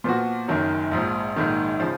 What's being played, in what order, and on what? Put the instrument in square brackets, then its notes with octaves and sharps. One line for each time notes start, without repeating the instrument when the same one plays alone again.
[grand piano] A#2 F3 B3 F#4
F#1 F#2 D#3 F#3
A#1 G#2 F3
A#1 G#2 D#3
C#3 F3